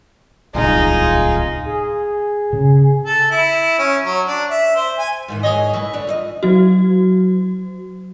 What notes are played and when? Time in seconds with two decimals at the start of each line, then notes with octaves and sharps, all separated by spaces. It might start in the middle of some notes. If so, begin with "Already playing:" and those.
0.55 D1 C2 D#4 F4 G#4
1.66 G#4
2.53 C#3
3.06 A4
3.31 E4
3.79 C#4
4.05 F#3
4.27 D4
4.50 E5
4.76 C5
4.99 G#5
5.28 G#2 D#3 E3
5.43 G#4 C#5 D#5
5.74 E3 B4 C#6
5.93 D3 D4
6.07 F4 C5 D#5
6.43 F#3 F#4